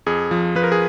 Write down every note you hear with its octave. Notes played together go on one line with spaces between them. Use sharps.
F2 G#4
F3
F3 B4
A#4
G#4